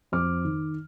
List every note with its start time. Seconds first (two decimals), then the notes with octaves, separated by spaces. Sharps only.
0.12 F2 D6 F6
0.44 D#3